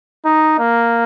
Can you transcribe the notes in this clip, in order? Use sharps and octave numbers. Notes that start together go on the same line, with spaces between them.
D#4
A#3